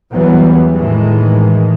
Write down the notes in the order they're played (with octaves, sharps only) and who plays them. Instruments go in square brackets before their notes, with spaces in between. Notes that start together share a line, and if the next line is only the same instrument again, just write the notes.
[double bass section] E2 E3 F#3 G3 B3
A2 D#3 E3 G#3